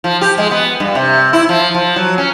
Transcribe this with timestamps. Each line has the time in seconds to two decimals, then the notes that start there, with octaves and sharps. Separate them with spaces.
0.04 F3
0.21 G4
0.38 G#3
0.51 B3
0.80 G2
0.95 C3
1.33 E4
1.49 F3
1.74 F3
1.96 F#3
2.18 C#4